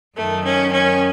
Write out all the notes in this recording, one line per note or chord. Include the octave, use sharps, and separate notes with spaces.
F#2 D#3 A3
C#4
C#4